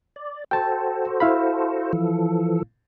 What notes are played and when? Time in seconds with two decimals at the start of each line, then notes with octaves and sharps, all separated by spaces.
0.16 D5
0.51 F#4 A4 C5 G5 A5
1.20 E4 F5 B5
1.93 E3 F3 A4